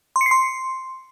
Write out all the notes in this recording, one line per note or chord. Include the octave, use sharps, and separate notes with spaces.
C6
C#7
C7
C6